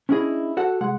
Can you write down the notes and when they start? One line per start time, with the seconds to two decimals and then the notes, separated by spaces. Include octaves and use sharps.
0.09 C#4 D4 E4 F#4 G#4 D#5
0.57 F#4 A4 F#5
0.81 C2 G#3 F#5